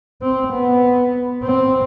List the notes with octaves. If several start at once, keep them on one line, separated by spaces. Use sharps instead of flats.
C4
B3
C4